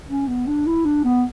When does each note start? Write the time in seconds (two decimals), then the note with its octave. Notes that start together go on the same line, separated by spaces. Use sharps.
0.08 C#4
0.28 B3
0.47 D4
0.67 E4
0.85 D4
1.04 B3